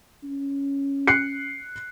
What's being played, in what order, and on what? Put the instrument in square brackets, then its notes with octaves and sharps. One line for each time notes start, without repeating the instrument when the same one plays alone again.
[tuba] C#4
[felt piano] F#6 C7 C#7